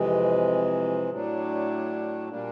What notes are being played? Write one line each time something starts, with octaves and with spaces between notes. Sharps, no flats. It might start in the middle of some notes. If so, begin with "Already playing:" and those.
Already playing: F2 C3 E3 G#3
A2 F#3 A3 D4
A#2 G3 A#3 D4